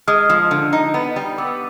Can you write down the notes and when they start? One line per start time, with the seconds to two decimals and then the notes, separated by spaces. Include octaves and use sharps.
0.08 G#3 D#6 F6
0.30 F3
0.51 D3
0.73 D#4
0.94 B3
1.16 G3
1.38 B3 D6 E6